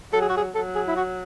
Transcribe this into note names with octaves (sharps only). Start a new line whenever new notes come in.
F#3 A4
G#4
F#4
G#4
F#3 A4
G#4
E4
F#4